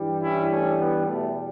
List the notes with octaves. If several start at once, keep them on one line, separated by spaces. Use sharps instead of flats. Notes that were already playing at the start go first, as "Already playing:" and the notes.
Already playing: G2 E3 G3
C#4 E4
A3 C#4
B3
E2 B2 G3 A3